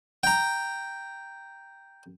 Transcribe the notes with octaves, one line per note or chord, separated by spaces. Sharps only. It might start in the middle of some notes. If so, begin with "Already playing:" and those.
G5 A#5